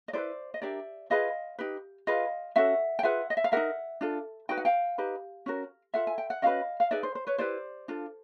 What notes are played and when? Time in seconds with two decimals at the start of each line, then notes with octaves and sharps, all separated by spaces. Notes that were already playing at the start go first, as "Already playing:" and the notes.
0.08 D#5
0.13 E4 G#4 B4 C5 D5
0.54 D#5
0.62 D4 G4 A#4 D5 E5
1.10 F4 G#4 B4 D#5 F5
1.59 D#4 G4 B4
2.07 F4 G#4 B4 D#5 F5
2.56 C#4 F#4 A4 E5 F#5
2.99 G5
3.03 F4 G#4 B4 E5 F#5
3.30 D#5
3.37 E5
3.44 F5
3.52 G4 A#4 E5 F#5
3.57 D#4
4.01 D4 F4 A4
4.49 D#4 F#4 B4 G5
4.57 F#5
4.65 F5 G5
4.98 D#4 G4 B4
5.46 C#4 F#4 A#4
5.94 F4 A4 E5 F#5
6.07 G#5
6.18 G5
6.30 F#5
6.42 C#4 F#4 B4 D#5 F5
6.80 F5
6.91 D#4 G#4 B4 D5 E5
7.03 C5
7.15 C5
7.27 B4 C#5
7.38 E4 G4 B4 C5 D5
7.88 D4 F4 A4